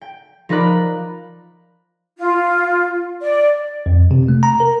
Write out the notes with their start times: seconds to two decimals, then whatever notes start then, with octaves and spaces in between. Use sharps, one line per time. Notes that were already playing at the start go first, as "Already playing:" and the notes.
0.01 G5
0.49 F3 D#4 A#4 D5 B5 F#6
2.18 F4
3.21 D5
3.86 F2
4.11 C3
4.28 A3
4.43 A#5
4.60 A#4